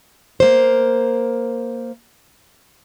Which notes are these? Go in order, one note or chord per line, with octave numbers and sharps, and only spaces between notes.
A#3 C5